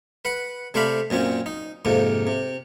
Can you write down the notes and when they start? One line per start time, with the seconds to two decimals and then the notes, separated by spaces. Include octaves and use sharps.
0.25 B4 F#5
0.74 C3 A3 C5 D5 F5 B5
1.10 F#2 A#2 C4 C#4
1.46 D#4
1.85 F2 G#2 C3 A#3
2.27 C3